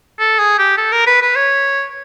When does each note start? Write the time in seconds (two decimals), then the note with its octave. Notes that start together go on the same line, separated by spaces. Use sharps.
0.20 A4
0.39 G#4
0.59 G4
0.78 A4
0.92 A#4
1.07 B4
1.22 B4
1.36 C#5